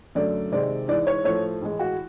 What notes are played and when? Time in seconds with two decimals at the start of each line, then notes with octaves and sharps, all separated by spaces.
0.15 F#2 D3 F#3 A3 D5
0.52 C3 D#3 G#3 D5
0.88 G#2 E3 G#3 D5
1.07 C#5
1.24 A2 F3 A3 C#5
1.62 A2 E3 G#3
1.79 F#4